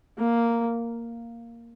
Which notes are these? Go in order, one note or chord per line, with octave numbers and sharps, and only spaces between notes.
A#3